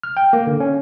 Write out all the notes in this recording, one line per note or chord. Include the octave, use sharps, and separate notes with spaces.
F6
G5
A#3
D3
C#4